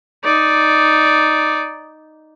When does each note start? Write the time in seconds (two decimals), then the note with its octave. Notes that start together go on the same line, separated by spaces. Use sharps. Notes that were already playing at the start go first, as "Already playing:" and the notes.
0.24 D#4 D5